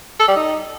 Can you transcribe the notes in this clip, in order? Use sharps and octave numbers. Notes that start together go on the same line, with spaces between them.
A4
G3
D#4